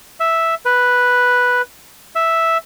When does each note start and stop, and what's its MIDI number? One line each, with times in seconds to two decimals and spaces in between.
0.20 0.55 76
0.65 1.62 71
2.16 2.58 76